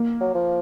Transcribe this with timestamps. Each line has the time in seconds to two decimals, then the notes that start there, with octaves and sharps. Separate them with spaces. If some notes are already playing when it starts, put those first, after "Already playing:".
Already playing: A#3
0.20 F#3
0.35 F3